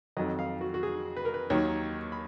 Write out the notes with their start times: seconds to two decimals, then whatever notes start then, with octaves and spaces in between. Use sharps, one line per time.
0.17 F2 D#3 F#3 D#5
0.39 F5
0.61 F#4
0.74 F#4
0.83 G#4
1.16 B4
1.25 A#4
1.34 B4
1.50 D#2 D#3 F#3 C#5
2.12 B5